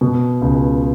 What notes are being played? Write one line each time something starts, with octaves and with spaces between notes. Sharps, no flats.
B2
C#2